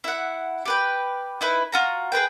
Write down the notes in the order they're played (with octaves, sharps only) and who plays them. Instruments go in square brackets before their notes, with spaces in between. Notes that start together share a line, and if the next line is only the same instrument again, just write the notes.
[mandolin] E4 F#5
G4 B4 G5
D#4 E4 B4
F4 F#4 A#5
G#4 A#4 B4 G5